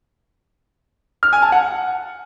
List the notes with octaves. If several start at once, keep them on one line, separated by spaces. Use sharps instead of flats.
F6
G#5
A5
F#5